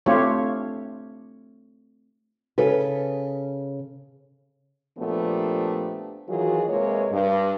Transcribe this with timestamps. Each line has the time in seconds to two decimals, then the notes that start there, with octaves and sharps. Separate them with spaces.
0.06 A3 C4 D4 F4 G4 C#5
2.58 C#3 A4 B4
4.98 A#2 F3 A3 B3 D4 G4
6.28 D#3 E3 F#3 F4 F#4 G#4
6.69 C3 G#3 A#3 B4 C#5
7.12 G2